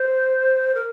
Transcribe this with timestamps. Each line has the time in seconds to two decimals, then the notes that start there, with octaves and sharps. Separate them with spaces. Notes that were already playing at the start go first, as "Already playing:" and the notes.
Already playing: C5
0.74 A#4